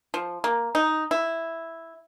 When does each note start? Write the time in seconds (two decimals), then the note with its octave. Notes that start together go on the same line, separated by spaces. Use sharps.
0.14 F3
0.44 A#3
0.75 D#4
1.11 E4